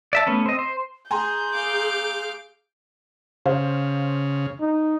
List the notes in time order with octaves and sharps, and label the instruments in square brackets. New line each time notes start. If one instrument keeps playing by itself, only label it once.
[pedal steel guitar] D5 E5 A5
A3 B3 C#4
C4 D#5
C5
[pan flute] G#4 [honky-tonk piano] G#5 A#5 C6 [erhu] G6
[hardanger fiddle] F5 D6
[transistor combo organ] C#3 [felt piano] C5 F5
[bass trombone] D#4